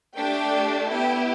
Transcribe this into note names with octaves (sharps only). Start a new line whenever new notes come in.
A3 D4 G4 G5
B3 E4 G4 G5